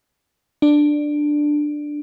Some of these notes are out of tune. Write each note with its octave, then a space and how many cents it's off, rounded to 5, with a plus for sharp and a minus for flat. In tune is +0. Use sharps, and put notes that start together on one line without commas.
D4 +10